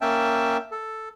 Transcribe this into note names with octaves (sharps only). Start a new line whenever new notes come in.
A#3 C#4 E5 G5 A5
A4